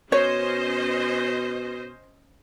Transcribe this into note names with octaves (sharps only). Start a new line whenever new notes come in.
B2 C#4 C5 C#5 D#5